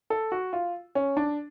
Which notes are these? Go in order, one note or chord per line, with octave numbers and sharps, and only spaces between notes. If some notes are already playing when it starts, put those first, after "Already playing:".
A4
F#4
F4
C#4
D4